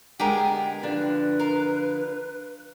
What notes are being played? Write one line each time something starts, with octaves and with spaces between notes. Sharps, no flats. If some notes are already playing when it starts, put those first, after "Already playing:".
D3 G#3 B3 G4 G#4 A#4 G5
D3 F3 D4 B4
A#4 F5